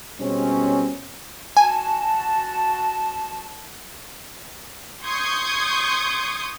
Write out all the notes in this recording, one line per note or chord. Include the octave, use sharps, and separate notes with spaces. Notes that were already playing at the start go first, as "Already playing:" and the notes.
B2 G3 G#3 C4 C#4
F#4 G#5 A5
C6 C#6 D#6 G6 G#6